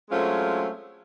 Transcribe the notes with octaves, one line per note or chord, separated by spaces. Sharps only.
F#3 G#3 A3 C4 C#4 F4